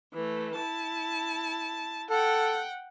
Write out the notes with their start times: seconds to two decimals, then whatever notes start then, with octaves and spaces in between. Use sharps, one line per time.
0.13 E3 A3
0.55 E4 A5
2.10 A4 F#5 G5